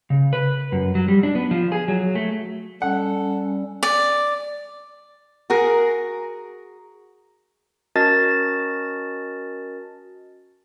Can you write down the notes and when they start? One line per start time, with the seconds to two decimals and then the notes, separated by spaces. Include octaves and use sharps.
0.10 C#3
0.33 B4
0.72 F#2
0.95 F#3
1.08 G3
1.23 D4
1.35 B3
1.51 F3
1.72 G#4
1.88 F#3
2.15 A3
2.82 G3 C#4 A4 F#5
3.83 D5
5.50 F#4 G#4 A#4
7.96 C#4 F#4 A#4 D#5 A5 A6